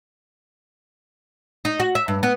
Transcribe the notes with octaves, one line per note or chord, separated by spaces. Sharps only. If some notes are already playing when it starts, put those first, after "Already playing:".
D#4
F#4
E5
G2
B3